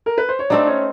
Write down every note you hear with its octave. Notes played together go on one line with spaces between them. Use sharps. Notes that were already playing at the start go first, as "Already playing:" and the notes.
A#4
B4
C5
C#5
A3 C4 D4 D#4 D5
C#4 C#5